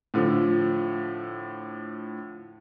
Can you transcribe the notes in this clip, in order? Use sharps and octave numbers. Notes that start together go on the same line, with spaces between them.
A2 D3 F3